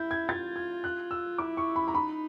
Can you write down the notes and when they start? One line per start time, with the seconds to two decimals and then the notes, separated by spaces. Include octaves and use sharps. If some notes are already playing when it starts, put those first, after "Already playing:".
Already playing: E4 G6
0.11 G#6
0.28 F4 A6
0.56 G#6
0.84 F#6
1.11 E6
1.38 E4 D6
1.57 C#6
1.76 B5
1.88 A#5
1.94 D#4 B5